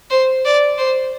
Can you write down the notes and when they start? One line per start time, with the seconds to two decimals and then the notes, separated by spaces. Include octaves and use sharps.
0.11 C5
0.45 D5
0.78 C5